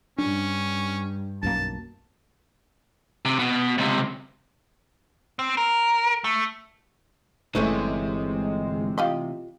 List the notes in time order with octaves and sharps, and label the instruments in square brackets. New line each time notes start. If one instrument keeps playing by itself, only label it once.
[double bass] G2 [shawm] C#4 [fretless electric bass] D4
[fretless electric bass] B1 F#2 A#3 [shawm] A5
[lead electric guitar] C3
B2
C#2 C3
C4
A#4
A3
[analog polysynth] G1 G#3 [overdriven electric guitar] C3 [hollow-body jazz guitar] E3 A3 C#4
[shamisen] F4 G4 D#5